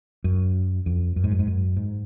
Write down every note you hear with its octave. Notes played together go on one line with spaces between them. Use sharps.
F#2
F2
F#2
G#2
F#2
G#2
F#2
G#2